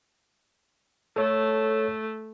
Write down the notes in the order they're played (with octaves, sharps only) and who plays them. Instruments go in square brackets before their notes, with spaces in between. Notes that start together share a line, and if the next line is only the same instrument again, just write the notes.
[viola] A3 [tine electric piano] A4 C#5